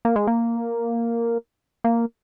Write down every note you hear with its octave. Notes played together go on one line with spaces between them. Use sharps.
A#3
G#3
A#3
A#3